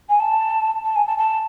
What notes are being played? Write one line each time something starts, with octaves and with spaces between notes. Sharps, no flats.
G#5
A5
A5
G#5
A5
A5